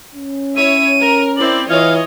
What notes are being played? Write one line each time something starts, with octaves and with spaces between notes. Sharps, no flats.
C#4
E4 C#5 E5 D#7
A#4
C4 E4 D5 F#7
E3 F4 C#5 D#5 F5